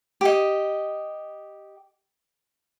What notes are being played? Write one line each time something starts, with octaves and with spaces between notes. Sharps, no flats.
G4 D#5